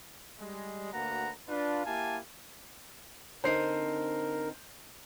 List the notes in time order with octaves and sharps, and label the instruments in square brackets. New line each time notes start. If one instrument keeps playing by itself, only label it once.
[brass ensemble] G3 G#3
D2 A#3 F#4 B4 F#5 A#5
D4 F4 B4
A#3 E4 G4 F5 G#5 A5
[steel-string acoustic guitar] D3 C4 D#4 [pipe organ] A#4 [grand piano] C5 C7